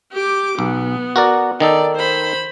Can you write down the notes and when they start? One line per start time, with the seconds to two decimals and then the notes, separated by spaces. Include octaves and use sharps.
0.12 G4 D6
0.59 B1 B3
1.16 F#4 A#4 D5
1.60 D#3 D#4 A4 D5
1.96 C5 B5